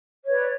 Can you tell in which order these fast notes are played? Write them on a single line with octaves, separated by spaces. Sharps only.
C#5 B4 D5